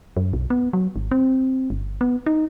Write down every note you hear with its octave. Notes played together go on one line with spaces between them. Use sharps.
F#2
B1
B3
F#3
G#1
C4
G1
B3
D#4